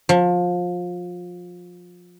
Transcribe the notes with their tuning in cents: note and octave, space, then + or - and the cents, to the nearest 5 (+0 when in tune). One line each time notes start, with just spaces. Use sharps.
F3 +25